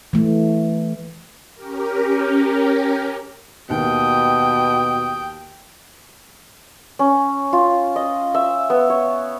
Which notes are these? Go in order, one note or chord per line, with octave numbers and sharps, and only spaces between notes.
E3 A3
C#4 G4 A#4
D#2 B2 G5 D#6
C#4
F4
D#5
E5
B3
C#5